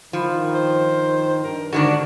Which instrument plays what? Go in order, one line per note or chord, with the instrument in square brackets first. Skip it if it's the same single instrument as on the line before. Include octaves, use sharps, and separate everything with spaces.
[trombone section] G2 D#3 [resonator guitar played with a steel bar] F3
[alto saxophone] C5
[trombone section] G2 [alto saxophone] A#4
[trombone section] G#2 [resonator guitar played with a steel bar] D3 D#3 D4 [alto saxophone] F#4